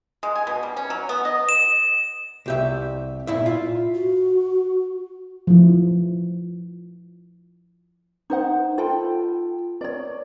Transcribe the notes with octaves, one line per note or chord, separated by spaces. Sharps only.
G#3
G#5
B2
G3
C#4
F#3
B3
D#5
E7
C2 G4 E5
A#2 E4 E5
F4
F#4
F3 E4
D#4 C5 F#5
F4 A4 G5 B5
C#5 D5